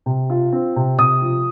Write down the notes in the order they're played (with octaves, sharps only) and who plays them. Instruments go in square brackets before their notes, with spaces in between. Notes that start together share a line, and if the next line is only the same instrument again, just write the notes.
[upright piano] C3
F4
C4
C3
C3 D#6
F3